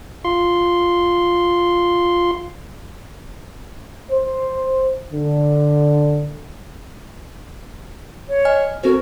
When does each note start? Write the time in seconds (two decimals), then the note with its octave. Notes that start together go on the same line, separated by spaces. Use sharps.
0.25 F4 C6
4.11 C5
5.13 D3
8.29 C#5
8.45 D#5 G#5 F6
8.83 C4 F#4 A4 A#4 C5